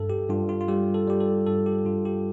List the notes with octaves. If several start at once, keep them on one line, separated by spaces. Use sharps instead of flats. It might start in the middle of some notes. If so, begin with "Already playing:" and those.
Already playing: G2 A4
G4
G2 F4
F4
F4
G3 G4
A4
G3 G4
A4
G2 A4
G4
G2 F4
G4